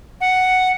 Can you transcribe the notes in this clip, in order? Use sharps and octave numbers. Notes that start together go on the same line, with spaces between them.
F#5